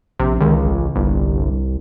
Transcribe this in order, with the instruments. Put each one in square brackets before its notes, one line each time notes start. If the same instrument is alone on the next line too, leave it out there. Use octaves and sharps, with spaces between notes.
[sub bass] A#1 [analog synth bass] C3
[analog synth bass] C#2 [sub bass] D#3
[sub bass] A1
[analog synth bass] G1 [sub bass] C2